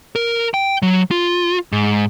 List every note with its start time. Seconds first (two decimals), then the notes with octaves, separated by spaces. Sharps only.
0.16 A#4
0.54 G5
0.82 F#3
1.11 F4
1.72 G#2